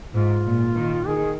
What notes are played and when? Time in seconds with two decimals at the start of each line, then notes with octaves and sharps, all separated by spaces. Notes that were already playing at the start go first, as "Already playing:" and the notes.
0.14 G#2 F4
0.45 A#2
0.76 D#3
1.07 D#3 G#4